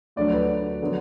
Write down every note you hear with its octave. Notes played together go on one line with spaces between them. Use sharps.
D2 D3 F#3 D4 D5
B4
D3 F#3 B3 D4